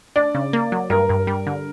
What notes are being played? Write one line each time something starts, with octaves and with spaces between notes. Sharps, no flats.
D4 D5
C#3
A#3
F#3
G2 A#4
G2
G3
D3